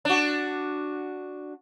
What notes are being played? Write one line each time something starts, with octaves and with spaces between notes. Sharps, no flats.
D4 F#4